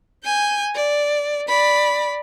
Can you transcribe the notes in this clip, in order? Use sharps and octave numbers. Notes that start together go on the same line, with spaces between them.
G#5 G6
D5
D5 B5